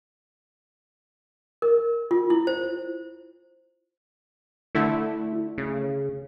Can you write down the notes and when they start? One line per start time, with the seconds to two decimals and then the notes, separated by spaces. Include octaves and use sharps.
1.62 A#4
2.11 F4
2.30 E4
2.47 C5
4.75 D3 A3 E4
5.58 C#3